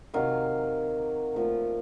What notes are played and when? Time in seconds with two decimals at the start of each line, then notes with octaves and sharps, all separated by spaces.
0.14 C3 D#3 F#3 F5
1.35 A#2 F3 A3